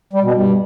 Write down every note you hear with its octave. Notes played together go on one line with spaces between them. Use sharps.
G3
B2
G2